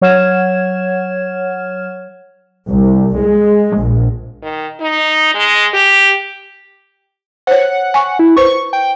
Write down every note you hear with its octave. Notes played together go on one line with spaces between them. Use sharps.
F#3 C#5 F#5 F6 G#6 E7
C2
G#3
A#1
D#3
D#4
G#3
G4
C5 C#5 F#5
G#5 C#6
E4
B4 C5 C#6
G5